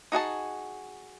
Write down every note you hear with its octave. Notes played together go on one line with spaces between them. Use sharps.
D#4 F#4 G#4 A5